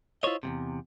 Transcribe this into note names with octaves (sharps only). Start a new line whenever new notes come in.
E4 F4 A#4 C5 C#5 D#5
E2 G2 C3